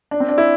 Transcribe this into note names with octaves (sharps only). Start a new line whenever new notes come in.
D4
C4
D4
E4